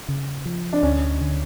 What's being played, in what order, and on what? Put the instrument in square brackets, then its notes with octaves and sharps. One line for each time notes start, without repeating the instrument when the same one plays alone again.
[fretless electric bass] C#3
F3
[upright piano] D4
[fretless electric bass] D2 [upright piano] C#4
[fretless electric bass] D3